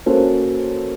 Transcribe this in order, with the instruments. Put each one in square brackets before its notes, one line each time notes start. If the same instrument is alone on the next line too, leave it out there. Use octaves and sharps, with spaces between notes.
[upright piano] A#3 C#4 F#4 A4 C5